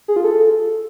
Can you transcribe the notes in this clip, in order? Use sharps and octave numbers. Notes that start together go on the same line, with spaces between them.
G#4
F4
A4